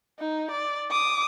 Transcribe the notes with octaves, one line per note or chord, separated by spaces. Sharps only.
D#4
D5
D6 D#6